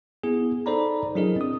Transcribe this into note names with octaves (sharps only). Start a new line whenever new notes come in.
B3 E4 G#4
D#4 A4 C5 D5 A#5 B5
F#3 D4 E4 G#4 A#4 D#5
C4 D#6